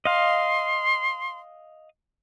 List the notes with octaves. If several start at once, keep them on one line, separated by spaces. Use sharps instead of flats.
D#5 F5 C6